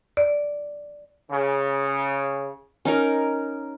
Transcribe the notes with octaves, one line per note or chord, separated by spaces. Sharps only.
D5
C#3
C#4 D#4 A#4